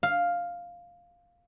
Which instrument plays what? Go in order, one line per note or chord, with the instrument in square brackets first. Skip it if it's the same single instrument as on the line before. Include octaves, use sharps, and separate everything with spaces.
[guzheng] F5